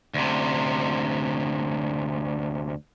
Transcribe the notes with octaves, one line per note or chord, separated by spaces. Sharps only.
D2 C3